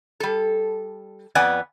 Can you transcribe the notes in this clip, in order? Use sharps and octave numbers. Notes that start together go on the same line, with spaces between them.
G3 A4
F2 B3 D5 F#5 G#5